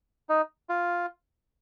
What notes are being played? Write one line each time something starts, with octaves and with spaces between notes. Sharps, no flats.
D#4
F4